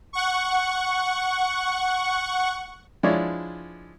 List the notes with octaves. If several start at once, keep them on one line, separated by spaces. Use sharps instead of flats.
F#5 C#6
F3 G#3 D4 E4 C#5 D5